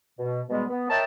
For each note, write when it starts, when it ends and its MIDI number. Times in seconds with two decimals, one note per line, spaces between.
0.19 0.41 47
0.49 0.64 44
0.49 0.64 47
0.49 0.64 55
0.49 0.64 56
0.49 0.64 59
0.69 0.85 59
0.89 1.04 70
0.89 1.04 73
0.89 1.04 75
0.89 1.04 76
0.89 1.04 79
0.89 1.04 81